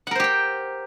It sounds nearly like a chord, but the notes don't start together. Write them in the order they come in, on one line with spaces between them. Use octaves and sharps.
F#5 A#4 C5 G4 G5